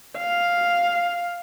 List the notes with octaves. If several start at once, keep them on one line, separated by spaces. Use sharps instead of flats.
F5